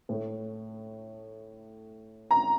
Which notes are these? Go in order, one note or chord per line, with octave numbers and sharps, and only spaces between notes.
A2 A3
A#5